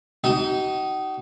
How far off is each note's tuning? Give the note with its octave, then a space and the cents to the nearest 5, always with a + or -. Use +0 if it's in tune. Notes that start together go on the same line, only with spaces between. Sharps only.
D#4 +0 F#4 +45 D#5 +0